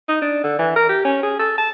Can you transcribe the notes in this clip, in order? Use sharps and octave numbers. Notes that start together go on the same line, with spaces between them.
D#4
D4
D3
E3
A#4
G4
C#4
G#4
A4
A5